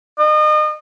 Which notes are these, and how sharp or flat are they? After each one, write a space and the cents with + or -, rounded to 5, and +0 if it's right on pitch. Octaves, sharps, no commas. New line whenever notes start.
D#5 -35